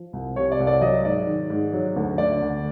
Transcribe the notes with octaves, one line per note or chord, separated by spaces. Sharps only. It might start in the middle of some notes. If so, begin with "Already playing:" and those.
Already playing: F3
C2
C3 C#5
D5
C2
D5
F#3 D#5
G#2 D5
D#3
G#2
F#3
D2
D3 D5
D2